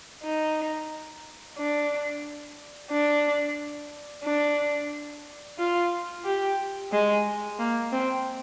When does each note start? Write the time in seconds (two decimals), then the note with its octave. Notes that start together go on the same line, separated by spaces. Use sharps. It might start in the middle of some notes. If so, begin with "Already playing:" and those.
0.23 D#4
1.57 D4
2.91 D4
4.24 D4
5.59 F4
6.25 G4
6.92 G#3
7.59 A#3
7.92 C4